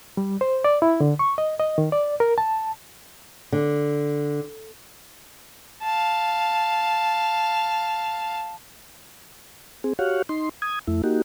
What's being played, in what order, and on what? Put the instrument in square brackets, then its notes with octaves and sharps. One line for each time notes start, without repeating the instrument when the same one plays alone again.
[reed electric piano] G3
C5
D5
E4
D3
C#6
D#5
D#5
D#3
D5
A#4
A5
[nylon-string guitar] D3
[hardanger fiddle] F5 A5
[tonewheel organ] C4 G#4
F#4 G4 C#5 F5 F#5
D#4 C6
D#6 G#6
F2 A3 E4
A#3 D#4 F#4 G4